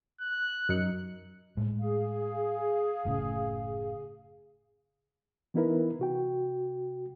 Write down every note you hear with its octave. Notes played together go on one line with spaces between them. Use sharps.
F#6
F#2 D#4 C#7
A2 G#3
G#4 F5
F#1 A2 C#3
E3 B3 D#4 E4 A#4 B4
C3 F#4 G5